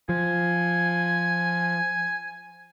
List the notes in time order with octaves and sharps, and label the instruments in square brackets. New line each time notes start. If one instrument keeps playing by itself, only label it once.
[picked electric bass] F3 [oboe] G#5